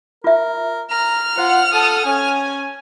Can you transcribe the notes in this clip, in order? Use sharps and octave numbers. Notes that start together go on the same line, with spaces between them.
F4 A#4 E5
A#5 F6
F4 C5 F#5
A4 F#5 A5 D#6
C#4 G#5